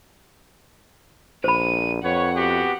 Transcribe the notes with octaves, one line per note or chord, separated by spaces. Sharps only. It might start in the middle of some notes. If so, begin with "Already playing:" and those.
A#1 C5 B5 D#7
F2 B4 C#5 F#5
B3 F#4 G4